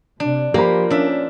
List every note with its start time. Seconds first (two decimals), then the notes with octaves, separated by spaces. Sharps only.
0.20 C3 D4
0.54 F3 A#3 G4 A#4 C5 B5
0.90 C#4 D4 E5